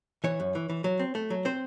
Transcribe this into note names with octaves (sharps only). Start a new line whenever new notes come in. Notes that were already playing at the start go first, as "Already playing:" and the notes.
E3 C#5
F#2
E3
E3
F#3
C4
A3
F#3
C4 C5